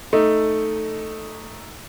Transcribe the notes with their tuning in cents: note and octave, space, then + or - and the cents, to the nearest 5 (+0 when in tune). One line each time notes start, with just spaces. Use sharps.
A3 +0 D#4 +0